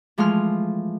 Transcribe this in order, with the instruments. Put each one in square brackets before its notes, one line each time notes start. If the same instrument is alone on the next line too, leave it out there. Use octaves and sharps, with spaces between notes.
[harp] E3 F3 G#3 A3 C6 F6